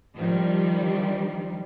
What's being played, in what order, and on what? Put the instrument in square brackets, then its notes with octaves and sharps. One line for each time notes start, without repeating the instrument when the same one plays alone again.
[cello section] D#3 F3 G3 D4